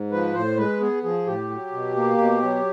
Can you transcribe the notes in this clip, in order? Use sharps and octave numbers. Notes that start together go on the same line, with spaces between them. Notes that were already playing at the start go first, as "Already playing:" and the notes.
Already playing: G#2
F3 B4
A2 C5
G#3 B4
B3 G#4
F3 G#4
A2 G4
F#3
B2
A#3
B2
F#3